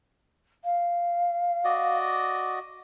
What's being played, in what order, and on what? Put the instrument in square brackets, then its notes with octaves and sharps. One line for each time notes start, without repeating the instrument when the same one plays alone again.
[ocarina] F5
[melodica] F#4 D5 D#5